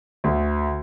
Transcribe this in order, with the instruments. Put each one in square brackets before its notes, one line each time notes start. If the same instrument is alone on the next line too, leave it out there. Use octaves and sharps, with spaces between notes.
[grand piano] D2